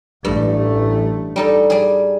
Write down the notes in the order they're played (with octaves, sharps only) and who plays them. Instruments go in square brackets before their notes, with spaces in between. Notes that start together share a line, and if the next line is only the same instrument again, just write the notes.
[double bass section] A1 A3 [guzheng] G2
[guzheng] G3 D#4 A4
G3 G#4